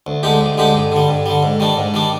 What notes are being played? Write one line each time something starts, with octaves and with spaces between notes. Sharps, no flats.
D2
D3 G#3 D#4 G4
D2
D3 G#3 D#4 G4
G2
D3 G3
G2
D3 G3
G#2
D#3 G3 D4
G#2
D#3 G3 D4